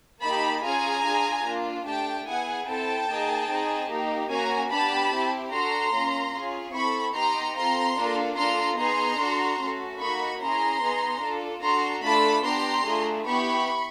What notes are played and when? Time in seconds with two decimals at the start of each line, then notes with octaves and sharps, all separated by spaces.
0.21 A#3 D#4 G4 A5 B5
0.62 C#4 F4 G#4 G#5 A#5
1.04 D4 F4 G#4
1.44 A#3 D4 F4
1.85 A3 D4 G4 G5 A5
2.25 B3 E4 G#4 F#5 G#5
2.66 C4 E4 A4 G5 A5
3.07 A#3 D#4 G#4
3.47 C4 D#4 G#4
3.88 A#3 D#4 G4
4.29 A#3 C#4 F#4 G#5 A#5
4.69 B3 D4 G4 A5 B5
5.11 C4 E4 G4
5.51 D4 F#4 A4 A#5 C6
5.92 A#3 C#4 F4
6.33 C#4 F4 G#4
6.73 C4 E4 A4 B5 C#6
7.14 B3 D#4 G4 A#5 C6
7.55 C4 F4 A4 A#5 C6
7.96 A#3 D4 F4 A4
8.36 D4 F4 A4 A#5 C6
8.77 B3 D#4 G#4 A#5 C6
9.17 D4 F#4 A4
9.59 A3 C#4 F#4 A4
9.99 A#3 D#4 F#4 B5 C#6
10.40 C#4 E4 G#4 A#5 C6
10.81 B3 D#4 G#4
11.21 D4 F4 A4
11.62 D4 F#4 A4 A#5 C6
12.03 A3 D4 F4 A4 A5 B5
12.44 B3 D4 G4 A#5 C6
12.84 A3 D4 F4 G#4
13.25 B3 E4 G4 B5 C#6